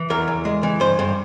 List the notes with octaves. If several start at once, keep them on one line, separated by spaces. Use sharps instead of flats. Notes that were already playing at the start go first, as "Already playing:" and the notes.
Already playing: E3
E2 A#4
E2
G#3
E3
G2 C5
G2